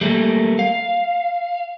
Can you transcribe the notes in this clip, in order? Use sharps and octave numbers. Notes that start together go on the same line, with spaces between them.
G3 A3 A#3
F5